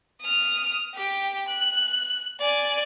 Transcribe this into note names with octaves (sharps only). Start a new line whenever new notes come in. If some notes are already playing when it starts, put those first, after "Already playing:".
D#6 F6
G4 G5
F#6
D5 G#5